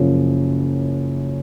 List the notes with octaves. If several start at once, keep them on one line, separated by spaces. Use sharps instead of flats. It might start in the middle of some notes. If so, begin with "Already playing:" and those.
Already playing: F#1 F#2 F3